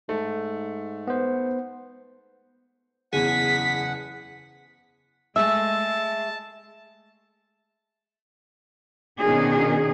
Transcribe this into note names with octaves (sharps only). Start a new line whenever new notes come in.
G#2 A3
B3 C5
F#1 E2 G#4 F#5 B6
G#3 A3 G#4 E5 A5 E6
B2 D#3 C#4 D4 G#4